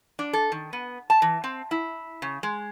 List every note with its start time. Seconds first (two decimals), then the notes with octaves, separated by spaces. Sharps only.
0.19 D4
0.33 A4
0.52 D#3
0.73 B3
1.10 A5
1.22 E3
1.44 C4
1.71 E4
2.22 C#3
2.43 G#3